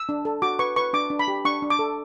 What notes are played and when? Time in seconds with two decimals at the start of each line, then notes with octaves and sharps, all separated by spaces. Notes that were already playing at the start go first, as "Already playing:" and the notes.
Already playing: E6
0.09 D4
0.25 A4
0.42 F#4 D6
0.59 B4 C#6
0.76 B4 C#6
0.93 D4 D6
1.10 D4
1.19 B5
1.28 G4
1.45 D4 C#6
1.62 D4
1.70 D6
1.79 A4